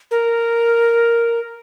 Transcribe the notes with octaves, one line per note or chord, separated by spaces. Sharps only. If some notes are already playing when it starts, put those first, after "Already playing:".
A#4